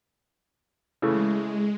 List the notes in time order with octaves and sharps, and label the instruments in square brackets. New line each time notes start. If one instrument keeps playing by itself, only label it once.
[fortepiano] C#3 E3 A3 [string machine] G#3